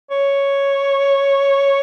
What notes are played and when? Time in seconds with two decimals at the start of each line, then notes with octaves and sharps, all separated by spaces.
0.11 C#5